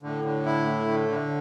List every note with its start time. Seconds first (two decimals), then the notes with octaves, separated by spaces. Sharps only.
0.03 A2 D3
0.25 D3
0.46 E4
0.66 A3
0.87 D3
1.09 D3